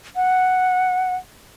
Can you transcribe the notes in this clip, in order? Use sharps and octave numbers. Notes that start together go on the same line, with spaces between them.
F#5